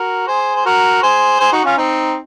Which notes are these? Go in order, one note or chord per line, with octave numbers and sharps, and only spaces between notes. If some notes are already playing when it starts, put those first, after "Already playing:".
Already playing: F#4 A#4
G#4 C5
C5
F#4 A#4
G#4 C5
G#4 C5
D#4 F#4
C#4 F4
C4 D#4